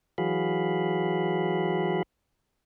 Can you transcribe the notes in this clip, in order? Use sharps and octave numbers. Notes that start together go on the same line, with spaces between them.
E3 F#3 F#4 G#4 F5 B5